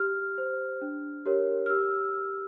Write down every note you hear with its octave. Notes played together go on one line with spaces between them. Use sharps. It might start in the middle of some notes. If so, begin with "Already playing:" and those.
Already playing: G4 F6
C5
D4
G4 A#4 C#5
F6
G4 E6